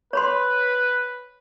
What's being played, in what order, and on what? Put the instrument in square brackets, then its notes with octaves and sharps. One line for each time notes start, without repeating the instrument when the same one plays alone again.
[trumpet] B4 [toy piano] C#5 B5 C6